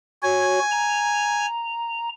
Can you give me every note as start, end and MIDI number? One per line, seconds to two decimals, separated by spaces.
0.23 0.60 66
0.23 0.60 73
0.23 1.46 80
0.72 2.09 82